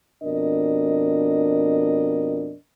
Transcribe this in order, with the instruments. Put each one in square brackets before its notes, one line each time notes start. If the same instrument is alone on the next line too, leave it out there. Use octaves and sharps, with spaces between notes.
[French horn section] F2 B2 D4 A#4 D#5